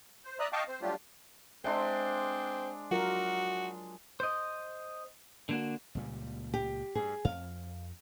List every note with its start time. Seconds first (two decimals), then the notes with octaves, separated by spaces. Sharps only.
0.25 C5
0.39 D5 E5 A#5 D#6 F#6
0.53 D#5 F5 G5 A5 C#6 D6
0.68 C4 C5
0.82 F#3 G3 A3 D4 F4 G4
1.64 G#3 C4 D4 C5 E5 C6
2.91 F#3 F4 F#4 A#4
4.20 C5 D#5
5.49 D3 A#3 F#4
5.95 C#2 A#2 G3
6.54 G4
6.95 G2 G#4
7.25 F2 F5